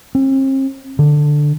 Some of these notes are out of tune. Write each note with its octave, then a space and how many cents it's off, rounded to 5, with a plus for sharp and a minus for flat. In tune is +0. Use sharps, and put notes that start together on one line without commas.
C4 +40
D3 +5